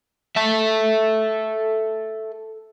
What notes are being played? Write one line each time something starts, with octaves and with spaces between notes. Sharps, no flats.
A4 E5